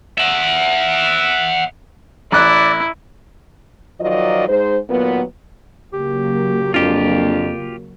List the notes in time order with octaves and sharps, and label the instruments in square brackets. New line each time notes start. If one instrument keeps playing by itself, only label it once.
[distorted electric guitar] E5 F#5
[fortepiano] A1 F#6 [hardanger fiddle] E4 [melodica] D5
[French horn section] D#3 F3 F#3 F4 D5 D#5
G#2 G#3 D#4 C5
D#2 A#2 F#3 B3
[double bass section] C#3 F#3 A#3 [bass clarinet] G4
[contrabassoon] A#1 [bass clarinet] F2 [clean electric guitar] F4 G4